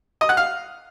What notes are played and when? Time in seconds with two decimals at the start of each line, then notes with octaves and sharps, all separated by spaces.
0.21 D#5
0.29 F#5
0.37 F5